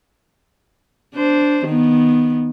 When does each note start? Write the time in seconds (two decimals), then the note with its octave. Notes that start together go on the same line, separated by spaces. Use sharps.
1.15 D4 C5
1.66 D#3 B3